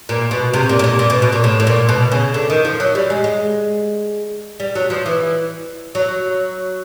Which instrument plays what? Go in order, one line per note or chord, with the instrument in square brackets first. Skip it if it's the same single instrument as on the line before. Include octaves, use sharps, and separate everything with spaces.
[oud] A#2
B2
C3
A#2
A2
A#2
A#2
B2
B2
A#2
A2
A2
A#2
B2
C#3
D3
D#3
F3
F#3
G3
G#3
G#3
G3
F#3
F3
E3
F#3